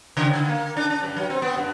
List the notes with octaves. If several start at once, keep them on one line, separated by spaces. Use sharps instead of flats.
C#3
D3
A#3
D4
D4
G2
F#3
C4
B3
G2